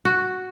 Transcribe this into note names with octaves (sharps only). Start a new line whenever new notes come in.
F#4